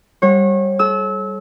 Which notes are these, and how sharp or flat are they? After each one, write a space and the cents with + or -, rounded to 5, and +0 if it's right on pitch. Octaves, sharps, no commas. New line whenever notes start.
G3 +0 C#5 -35 F#5 -20
A4 -45 E6 -25